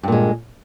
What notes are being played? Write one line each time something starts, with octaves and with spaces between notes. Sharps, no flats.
G2 A#2 G#3